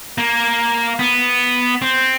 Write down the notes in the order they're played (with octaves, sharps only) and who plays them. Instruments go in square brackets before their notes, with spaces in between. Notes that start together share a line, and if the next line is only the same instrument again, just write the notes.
[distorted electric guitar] A#3
B3
C4